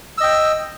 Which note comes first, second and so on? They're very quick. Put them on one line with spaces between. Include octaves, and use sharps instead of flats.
E6 D#5 G5